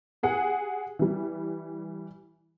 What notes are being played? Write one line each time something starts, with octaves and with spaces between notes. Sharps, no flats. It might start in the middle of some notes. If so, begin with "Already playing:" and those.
G4 G#4 F#5
E3 G3